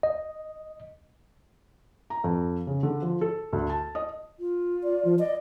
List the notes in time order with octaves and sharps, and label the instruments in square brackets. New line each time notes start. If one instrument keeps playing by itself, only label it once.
[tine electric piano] D#5
[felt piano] A#5
F2
C#3
D3
F3
A4
D2
A5
D#5
[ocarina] F4
[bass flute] D5
F3
[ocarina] D5 [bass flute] D#5